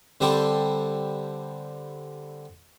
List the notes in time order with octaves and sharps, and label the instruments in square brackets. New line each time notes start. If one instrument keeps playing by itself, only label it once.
[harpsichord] D3 G3 C4 G4 A4